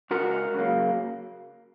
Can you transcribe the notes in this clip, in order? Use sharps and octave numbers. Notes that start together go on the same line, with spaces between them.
C#2 F#4 A#4
C#3 F#3 A#3